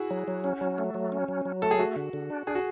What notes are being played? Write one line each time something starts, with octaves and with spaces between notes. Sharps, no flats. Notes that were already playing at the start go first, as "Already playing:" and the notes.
Already playing: E4 F#4 G#4
F#3
F#3
C#4
F#3
A3
F#3
C#4
F#3
F#3
A3 A4
G#4
A3 F#4
D3
D3
D4
D4 G#4
F#4